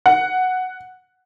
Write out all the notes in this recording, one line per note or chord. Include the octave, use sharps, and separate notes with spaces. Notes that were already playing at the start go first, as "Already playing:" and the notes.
F#5